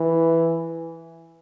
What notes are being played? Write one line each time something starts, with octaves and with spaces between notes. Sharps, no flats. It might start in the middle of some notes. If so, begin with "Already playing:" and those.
Already playing: E3